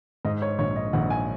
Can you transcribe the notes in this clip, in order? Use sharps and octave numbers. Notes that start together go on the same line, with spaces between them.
G#2 D#5
C#5
A#1 C#5
D#5
A#1 F#5
G#5